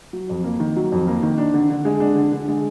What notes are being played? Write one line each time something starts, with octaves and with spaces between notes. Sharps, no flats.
F#3
F2
A#3
D#3
F#3
F2
A#3
D#3
D4
D3
D3
G#3
D4
D3
D3
G#3